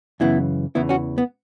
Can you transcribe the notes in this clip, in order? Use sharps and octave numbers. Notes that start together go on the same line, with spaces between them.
F#2 C#3 E3 B3 E4
E2 C#3 E3 B3 E4
C#4 F#4
B3